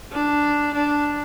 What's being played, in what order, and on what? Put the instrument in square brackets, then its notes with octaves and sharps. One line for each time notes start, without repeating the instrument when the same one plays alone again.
[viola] D4
D4